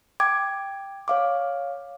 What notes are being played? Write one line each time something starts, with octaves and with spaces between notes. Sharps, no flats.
G5 D6 G#6
C#5 F5 D6